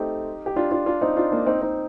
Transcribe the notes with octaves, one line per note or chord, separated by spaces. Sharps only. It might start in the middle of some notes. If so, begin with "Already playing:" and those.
Already playing: A3 C4 D#4 G4
G4
D4 F4
D4 F4
D4 F4
C4 D#4
D4 F4
A#3 D4
C4 D#4
C4 D#4